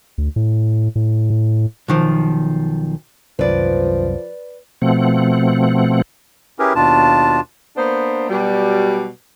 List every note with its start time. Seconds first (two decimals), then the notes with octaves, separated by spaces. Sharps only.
0.18 D2
0.36 A2
0.95 A2
1.30 A2
1.88 B1 D#3 F3
3.39 C2 F#2 D#3 F3 B4 D5
4.82 B2 F3 A3 C4 F#5
6.59 C#4 E4 G4 G#4 A#4 B4
6.75 D#2 B2 D4 F4 A5
7.77 A#3 B3 D4 C5
8.29 B2 F#3 G3